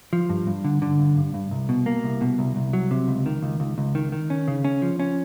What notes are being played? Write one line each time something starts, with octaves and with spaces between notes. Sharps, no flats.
F3
G2
G2
D3
D3
G2
G2
G2
C2
B2
A#3
C2
B2
C2
C2
F#3
C3
C#2
D#3
C#2
C#2
C#2
D#3
D#3
C#4
C#3
C#4
F3
C#4